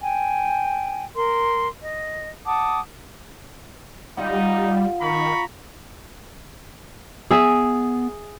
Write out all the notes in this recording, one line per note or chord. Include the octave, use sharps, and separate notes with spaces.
G5 G#5
A#4 C6
D#5
F#5 A5 D6 D#6
G3 D#4 F4 F#5
D#3 A#5 B5 C#6
B3 G#4 E5